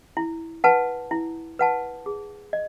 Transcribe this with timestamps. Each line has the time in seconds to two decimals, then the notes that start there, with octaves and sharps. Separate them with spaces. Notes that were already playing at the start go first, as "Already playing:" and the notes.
0.17 E4
0.64 B4 F#5 A5
1.11 E4
1.59 B4 F#5 A5
2.06 G#4
2.53 D#5